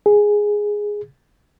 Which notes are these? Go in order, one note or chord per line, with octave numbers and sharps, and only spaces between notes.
G#4